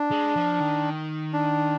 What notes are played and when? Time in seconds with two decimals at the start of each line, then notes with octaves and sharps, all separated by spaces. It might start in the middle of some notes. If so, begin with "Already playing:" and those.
Already playing: D4
0.11 G#3
0.36 F3
0.60 D#3
1.33 D4